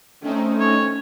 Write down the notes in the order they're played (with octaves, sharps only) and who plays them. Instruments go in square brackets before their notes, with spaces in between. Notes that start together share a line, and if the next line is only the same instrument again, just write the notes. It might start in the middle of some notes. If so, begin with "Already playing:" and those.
[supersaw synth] A3 C4 D#4 [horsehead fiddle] C#4
[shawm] C#5